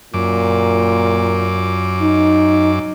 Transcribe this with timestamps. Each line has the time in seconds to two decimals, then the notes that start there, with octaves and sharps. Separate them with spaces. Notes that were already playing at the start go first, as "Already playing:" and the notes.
0.14 F#2 A#2 D6
2.02 D#4